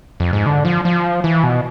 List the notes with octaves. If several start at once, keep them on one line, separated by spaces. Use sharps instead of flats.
F2
G#2
D3
F3
F3
E3
B2